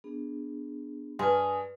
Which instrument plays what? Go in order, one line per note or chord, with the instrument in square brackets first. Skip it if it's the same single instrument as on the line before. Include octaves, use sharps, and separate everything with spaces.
[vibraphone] B3 D4 G#4
[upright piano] G2 [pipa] G#4 [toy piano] B4 C6